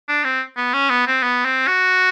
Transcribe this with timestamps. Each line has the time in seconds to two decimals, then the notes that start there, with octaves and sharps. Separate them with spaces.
0.08 D4
0.24 C4
0.57 B3
0.74 C#4
0.90 B3
1.07 C4
1.23 B3
1.45 C4
1.67 F#4